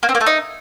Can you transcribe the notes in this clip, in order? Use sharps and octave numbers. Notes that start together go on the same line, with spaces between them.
A#3
C4
A#3
A3
D#4